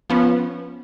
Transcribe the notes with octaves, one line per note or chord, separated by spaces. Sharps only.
F3 B3 C#4